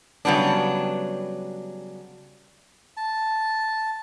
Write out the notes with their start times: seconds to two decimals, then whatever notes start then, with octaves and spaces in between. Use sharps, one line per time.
0.25 C#3 F#3 G3 B3 D4
2.97 A5